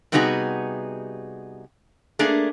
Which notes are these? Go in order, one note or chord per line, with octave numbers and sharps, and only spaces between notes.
C3 G3 B3 D#4 F#4 G#4
A3 A#3 D4 G#4